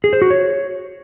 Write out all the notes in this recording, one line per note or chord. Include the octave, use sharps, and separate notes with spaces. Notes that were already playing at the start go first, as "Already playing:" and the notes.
G#4
C5
F#4
C#5